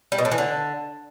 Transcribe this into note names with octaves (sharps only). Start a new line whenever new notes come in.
G3
B2
A2
E3
D3